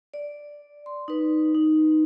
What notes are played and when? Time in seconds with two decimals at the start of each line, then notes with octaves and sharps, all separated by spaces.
0.14 D5
0.86 C6
1.08 D#4 B4
1.55 D#4